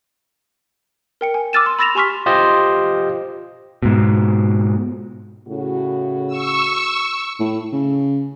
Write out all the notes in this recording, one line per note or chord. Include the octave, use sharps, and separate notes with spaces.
A#4 G5 C#7
G#5
D6 E6 F6 A6 D#7 E7
C6
B5 E6 A6 A#6 E7 F7
G4 G#5 C6 C#6 F6 B6
F4 G4 C5 D#5
G#2 B2
A2 C#3 F#4
C#6 E6
A2
C#3